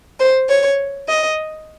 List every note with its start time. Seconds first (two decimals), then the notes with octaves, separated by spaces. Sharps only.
0.19 C5
0.48 C#5
1.08 D#5